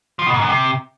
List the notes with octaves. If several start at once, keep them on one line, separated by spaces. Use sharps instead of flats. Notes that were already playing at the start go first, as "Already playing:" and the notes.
F3
B2
G#2
F#2
C3